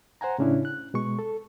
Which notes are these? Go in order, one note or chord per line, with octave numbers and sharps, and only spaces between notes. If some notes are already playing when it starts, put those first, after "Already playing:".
C5 F#5 G#5 A#5
A2 C#3 C#4 D4 E4
F#6
B2 G#3 C#6
A4